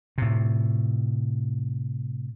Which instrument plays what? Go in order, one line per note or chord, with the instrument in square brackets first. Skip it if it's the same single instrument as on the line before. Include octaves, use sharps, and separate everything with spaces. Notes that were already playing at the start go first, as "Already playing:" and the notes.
[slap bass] A2 C3